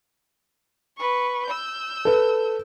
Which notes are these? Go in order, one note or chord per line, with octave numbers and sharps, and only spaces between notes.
B4 C#6
E6 G6
A4 B4